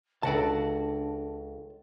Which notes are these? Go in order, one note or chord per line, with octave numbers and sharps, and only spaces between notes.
C#2 C#3 D4 F#4 A4 D5 A5